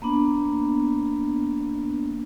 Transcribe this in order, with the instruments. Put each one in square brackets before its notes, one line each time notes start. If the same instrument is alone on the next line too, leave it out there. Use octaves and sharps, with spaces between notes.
[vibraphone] A#3 B3 D4